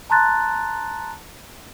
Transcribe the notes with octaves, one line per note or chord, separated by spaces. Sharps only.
A5 A#5 C6 F#6 A6